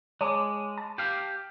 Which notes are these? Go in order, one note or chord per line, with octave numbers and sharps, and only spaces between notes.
G#3 C#5 A5 D6
A5
G4 F5